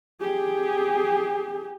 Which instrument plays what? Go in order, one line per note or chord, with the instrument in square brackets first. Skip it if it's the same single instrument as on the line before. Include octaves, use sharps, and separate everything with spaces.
[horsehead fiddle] G4 G#4